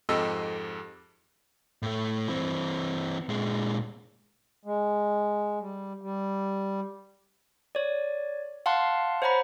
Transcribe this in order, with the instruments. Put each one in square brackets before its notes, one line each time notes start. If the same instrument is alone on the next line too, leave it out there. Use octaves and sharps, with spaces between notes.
[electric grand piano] F2 G#2 G4 A4 D#5 E6
[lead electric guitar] A2 A3
E3 C4
A#2 G#3
[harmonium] G#3
G3
G3
[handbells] C#5 D5
F5 F#5 A5 C6 F#6
C5 C#5 F#5 A#5 B5